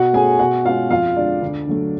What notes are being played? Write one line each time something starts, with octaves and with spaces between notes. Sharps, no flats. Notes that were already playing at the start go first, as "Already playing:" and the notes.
Already playing: B2 F#4 F#5
A3 C#4 G#4 G#5
B2 F#4 F#5
G#3 C#4 F4 F5
F2 F4 F5
D3 G#3 D4 D5
D2
D3 F#3 A3